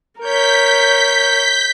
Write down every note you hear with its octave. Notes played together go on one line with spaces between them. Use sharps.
A#4 C#5 G6 B6